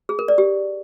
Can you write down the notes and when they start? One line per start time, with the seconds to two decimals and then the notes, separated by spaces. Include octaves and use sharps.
0.09 G#4
0.19 A#4
0.28 D5
0.38 G4